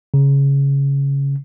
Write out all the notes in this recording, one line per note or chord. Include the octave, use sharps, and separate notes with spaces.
C#3